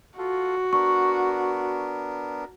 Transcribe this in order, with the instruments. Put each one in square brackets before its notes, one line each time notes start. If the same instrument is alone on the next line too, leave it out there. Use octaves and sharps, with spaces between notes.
[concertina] F4 A4 [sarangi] F#4
[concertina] B3 D4 A#4 [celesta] C#6